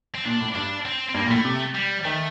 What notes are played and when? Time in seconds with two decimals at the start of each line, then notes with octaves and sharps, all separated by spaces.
0.15 C4
0.25 A#2 D4
0.41 A2
0.55 G2 D4
0.85 C4
1.09 C4
1.14 G2 A#3
1.25 A#2
1.30 A2 A3
1.45 C3
1.75 G3
2.04 D#3 A3